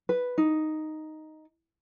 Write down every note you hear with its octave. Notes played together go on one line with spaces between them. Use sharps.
B4
D#4